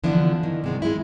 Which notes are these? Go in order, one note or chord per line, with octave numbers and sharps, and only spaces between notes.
D3 E3 F3 B3 D4 E4
D#3
C3 G#3 B3
G#3 E4